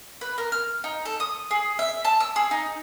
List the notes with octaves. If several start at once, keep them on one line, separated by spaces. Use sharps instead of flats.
B4
A#4
F6
D#4
A4
D#6
G#4
E5
A5
E6
G#4
D#4